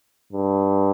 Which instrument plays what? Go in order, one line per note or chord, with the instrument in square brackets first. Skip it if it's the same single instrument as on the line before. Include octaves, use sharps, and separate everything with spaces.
[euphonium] G2